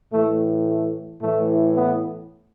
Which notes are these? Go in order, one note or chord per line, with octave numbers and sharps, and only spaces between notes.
A2 E3 A3
A3
A2 E3 A3
B3